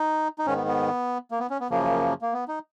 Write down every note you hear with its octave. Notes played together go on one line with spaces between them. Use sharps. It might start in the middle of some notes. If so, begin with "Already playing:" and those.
Already playing: D#4
D#4
G#2 D#3 C#4
B3
B3
A#3
B3
C#4
B3
F#2 C#3 F3 A#3
A#3
B3
D#4